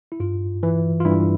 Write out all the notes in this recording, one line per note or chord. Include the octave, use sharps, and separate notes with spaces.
E4
G2 F4
E3
F4
G2 E4